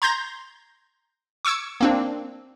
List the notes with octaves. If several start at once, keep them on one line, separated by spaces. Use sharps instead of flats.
A#5 C6 G6 G#6 A#6
C#6 D6 E6 G#6 C#7
A#3 C4 D4